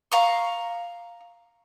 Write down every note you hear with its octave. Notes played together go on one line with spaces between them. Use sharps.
F5 A#5 C#6